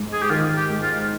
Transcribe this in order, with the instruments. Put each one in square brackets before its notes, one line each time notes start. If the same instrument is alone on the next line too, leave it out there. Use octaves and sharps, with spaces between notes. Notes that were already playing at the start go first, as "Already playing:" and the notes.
Already playing: [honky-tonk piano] G#2
[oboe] G#4
G4
[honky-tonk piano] D#3 [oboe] F4
[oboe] G4
[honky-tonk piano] G#2
[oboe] F4